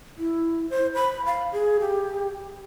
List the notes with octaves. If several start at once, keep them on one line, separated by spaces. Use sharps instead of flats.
E4
C5
B5
F5
G#4
G4